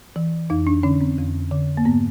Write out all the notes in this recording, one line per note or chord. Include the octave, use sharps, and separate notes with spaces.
E3
F2 D#4
D4
D3 C#4
C4
F2
D3
A#3
G#2 B3